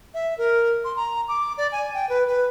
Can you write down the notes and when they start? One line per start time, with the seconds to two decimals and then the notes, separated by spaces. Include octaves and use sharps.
0.14 E5
0.38 A#4
0.84 C6
0.96 A#5
1.28 D6
1.58 D5
1.72 G#5
1.94 G5
2.09 B4
2.27 B4